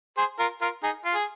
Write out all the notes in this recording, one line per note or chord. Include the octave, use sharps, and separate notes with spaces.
G#4 C5
F4 A#4
F4 A#4
D#4 G#4
F4
G#4